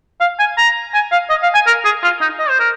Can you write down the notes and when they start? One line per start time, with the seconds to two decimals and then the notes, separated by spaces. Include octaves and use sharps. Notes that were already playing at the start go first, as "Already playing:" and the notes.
0.21 F5
0.39 G#5
0.58 A#5
0.94 G#5
1.12 F5
1.30 D#5
1.43 F5
1.55 G#5
1.67 A#4
1.85 G#4
2.03 F4
2.21 D#4
2.39 D#5
2.49 C5
2.60 A#4